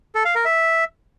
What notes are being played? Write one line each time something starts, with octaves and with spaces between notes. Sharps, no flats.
A4
F5
A#4
E5